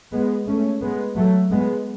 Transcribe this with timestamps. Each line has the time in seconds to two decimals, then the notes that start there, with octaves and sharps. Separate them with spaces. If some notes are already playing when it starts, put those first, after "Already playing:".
0.12 G#3 B3
0.47 A3 C#4
0.82 G#3 B3
1.17 F#3 A3
1.51 G#3 B3